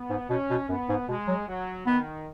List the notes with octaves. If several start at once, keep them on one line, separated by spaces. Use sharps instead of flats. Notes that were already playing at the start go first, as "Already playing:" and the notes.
Already playing: B3
G#2
B2 C#4
B2
F#2 B3
G#2
B2 G#3
F#3
F#3
D#3 B3